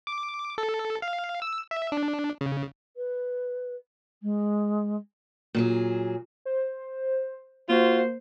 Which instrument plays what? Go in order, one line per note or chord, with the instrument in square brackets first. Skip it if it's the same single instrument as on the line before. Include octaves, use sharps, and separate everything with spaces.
[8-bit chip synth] D6
A4
F5
E6
E5
D4
C#3
[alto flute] B4
G#3
[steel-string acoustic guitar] A#2 F#3 G#4
[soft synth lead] C5
[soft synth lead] A#3 [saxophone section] F4 F#4 [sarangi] C5